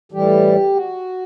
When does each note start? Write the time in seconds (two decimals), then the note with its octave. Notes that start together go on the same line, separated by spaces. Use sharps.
0.12 A2 E3 G3 G4
0.75 F#4